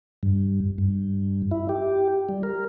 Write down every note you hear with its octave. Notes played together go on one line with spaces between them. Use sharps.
G2
G2
E4
G4
G3
A#4